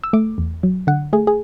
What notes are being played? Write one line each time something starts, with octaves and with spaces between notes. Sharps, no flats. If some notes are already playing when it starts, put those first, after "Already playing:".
E6
A3 D6
E2
F#3
D3 F#5
A3 G#4
G#4